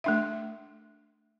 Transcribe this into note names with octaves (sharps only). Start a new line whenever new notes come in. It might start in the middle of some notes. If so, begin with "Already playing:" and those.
A3 D4 E5